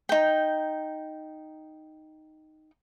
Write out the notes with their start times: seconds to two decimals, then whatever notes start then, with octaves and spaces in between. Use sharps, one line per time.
0.09 D#4 G5